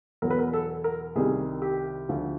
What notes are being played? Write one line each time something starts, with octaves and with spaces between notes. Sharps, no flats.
E2 B2 F#3 A#4
B4
A#4
A4
A#4
C2 C3 D#3 G3 G#4
G4
D2 D3 F3